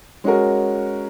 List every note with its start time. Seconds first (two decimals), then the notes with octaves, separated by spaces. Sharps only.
0.24 G#3 C#4 F#4 A#4